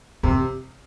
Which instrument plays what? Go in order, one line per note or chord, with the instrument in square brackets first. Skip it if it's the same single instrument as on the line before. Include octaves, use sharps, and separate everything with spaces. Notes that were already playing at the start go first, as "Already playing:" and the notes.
[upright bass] F2 [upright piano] C3